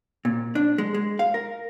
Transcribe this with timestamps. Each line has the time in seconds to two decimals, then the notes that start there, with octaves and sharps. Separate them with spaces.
0.25 A#2
0.55 D4
0.78 G#3
0.94 G#3
1.19 F5
1.34 A#4